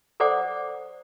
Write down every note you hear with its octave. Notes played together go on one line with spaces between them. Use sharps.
A4 C5 D5 F#5 D6